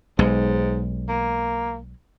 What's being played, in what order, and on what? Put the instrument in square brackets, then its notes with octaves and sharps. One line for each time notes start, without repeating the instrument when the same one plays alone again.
[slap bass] B1 G#3 [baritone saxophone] G#2
[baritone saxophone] A#3